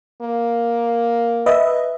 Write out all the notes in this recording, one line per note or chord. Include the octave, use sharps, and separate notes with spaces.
A#3
B4 D#5 E5